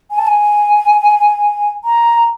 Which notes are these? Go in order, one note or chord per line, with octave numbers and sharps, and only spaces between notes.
G#5
A5
G#5
A#5